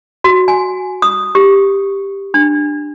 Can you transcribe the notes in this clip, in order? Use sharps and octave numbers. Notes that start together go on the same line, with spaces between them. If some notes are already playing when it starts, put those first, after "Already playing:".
F#4
G#5
D#6
G4
D4